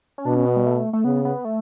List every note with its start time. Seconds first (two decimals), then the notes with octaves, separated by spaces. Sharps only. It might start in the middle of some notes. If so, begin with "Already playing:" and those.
0.18 C#4
0.26 B2 D4
0.36 C#4
0.46 B3
0.56 G3
0.66 A3
0.93 A3
1.04 C#3 B3
1.25 B3
1.45 A3